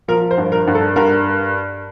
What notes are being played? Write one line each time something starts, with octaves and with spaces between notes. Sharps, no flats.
F3 A#4
C5
G2
A#4
G2
A4
G2 A#4